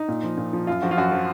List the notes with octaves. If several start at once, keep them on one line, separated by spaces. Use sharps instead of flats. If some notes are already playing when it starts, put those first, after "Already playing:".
Already playing: D#4
A#2
F3
A#2
F3
F#2 F4
F3 F#4
F4
F#2 F#4
F3